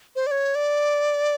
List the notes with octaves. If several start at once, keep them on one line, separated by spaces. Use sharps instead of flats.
C5
D5
C#5
D5